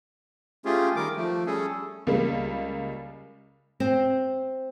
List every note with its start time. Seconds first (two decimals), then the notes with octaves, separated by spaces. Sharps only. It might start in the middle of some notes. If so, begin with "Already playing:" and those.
0.65 A3 C#4 F4 G4 G#4
0.96 D#3 G3 A#4 D6
1.16 F3 A3
1.46 G3 C#4 G#4 A4
2.07 C#2 G3 A#3
3.80 C4